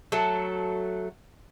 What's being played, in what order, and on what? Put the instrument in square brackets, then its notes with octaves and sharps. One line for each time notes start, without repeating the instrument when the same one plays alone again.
[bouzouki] F#3 A3 A4